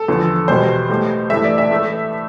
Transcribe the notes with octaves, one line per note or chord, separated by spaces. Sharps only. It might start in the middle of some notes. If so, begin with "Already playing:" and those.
Already playing: A4
E2 D3 F3
E2 B2 G3 C5
A2 G3
G2 E3 A3 E5
D5
E5
A2 E3 A3